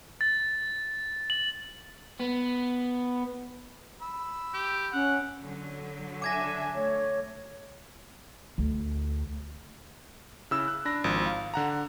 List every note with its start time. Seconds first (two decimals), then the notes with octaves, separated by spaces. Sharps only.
0.21 A6
1.30 F#7
2.20 B3
4.02 B5 E6
4.54 G4
4.93 C#4 F#5
5.41 D3 F#3
6.22 D4 E5 G#5 D6 G#6 A#6
6.75 A3 C#5
8.58 D2
10.51 C#3 E4 E6
10.68 F#6
10.85 D4 B5 A#6
11.04 G#1 F3
11.26 F5
11.54 D3 F#5 A#5